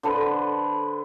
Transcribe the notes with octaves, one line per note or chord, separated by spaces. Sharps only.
D3 A4 B4 C5